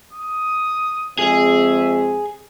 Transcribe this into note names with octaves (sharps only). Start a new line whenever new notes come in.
D#6
F2 G#3 C4 G#4 E5